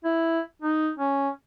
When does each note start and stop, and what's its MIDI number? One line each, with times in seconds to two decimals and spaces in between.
0.04 0.40 64
0.62 0.90 63
0.99 1.29 61